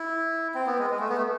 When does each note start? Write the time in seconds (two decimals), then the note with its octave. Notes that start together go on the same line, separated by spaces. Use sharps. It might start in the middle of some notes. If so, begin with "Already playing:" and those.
Already playing: E4
0.55 C4
0.67 B3
0.79 G#3
0.90 G#3
1.00 A3
1.09 B3
1.17 A3